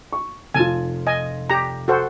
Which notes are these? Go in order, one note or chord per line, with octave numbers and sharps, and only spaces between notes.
C#6
F1 F4 G#5 A5
D#5 G#5
G4 A#5
F#4 A4 C5